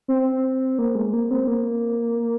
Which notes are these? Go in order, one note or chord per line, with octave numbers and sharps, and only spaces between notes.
C4
A#3
G#3
A#3
C4
A#3